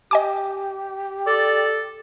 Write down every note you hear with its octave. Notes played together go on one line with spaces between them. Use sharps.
G4 D#5 G#5 D6
A4 D5